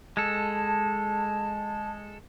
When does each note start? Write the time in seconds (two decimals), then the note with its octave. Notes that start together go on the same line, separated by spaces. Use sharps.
0.17 G#3 A4 A5